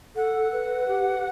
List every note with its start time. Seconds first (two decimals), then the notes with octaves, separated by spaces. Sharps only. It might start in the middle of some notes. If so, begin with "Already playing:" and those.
0.16 A4 F#5
0.52 B4
0.88 G4